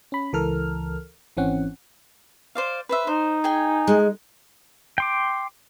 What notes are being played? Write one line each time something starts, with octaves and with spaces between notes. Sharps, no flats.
C#4 B5
C#2 E3 A4 A#4 F6
G#1 E3 C4 C#4 F#5
C5 D5 F5
B4 C5 E5
D#4 C5
G#4 G5 G#5
G#3
G5 C6 D6